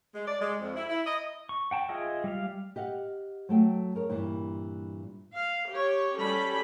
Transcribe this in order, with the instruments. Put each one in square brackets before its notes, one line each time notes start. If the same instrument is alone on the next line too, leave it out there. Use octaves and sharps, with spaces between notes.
[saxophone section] G#3
D5
G#3
F2
E4
E4
D#5
[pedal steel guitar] C#6
F#5 G5 A5
F4 G#4 D#5 E5
G3 F5
[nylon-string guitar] G4 D#5 F5 F#5
F#3 A3 G5
G#4 A#4 C#5
G2 A#2 E3 G3
[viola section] F5
G4 C#5
G3 C#4 A4 B5